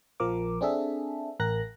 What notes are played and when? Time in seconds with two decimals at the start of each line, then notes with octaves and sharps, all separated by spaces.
0.20 A#1 F3 A#4 D6
0.61 C4 D4 G#4 A4 E5
1.40 A1 A#4 F#6 A#6